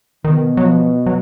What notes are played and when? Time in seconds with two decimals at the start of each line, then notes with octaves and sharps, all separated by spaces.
0.24 B2 D#3
0.57 F#3
0.65 F3
1.06 F#3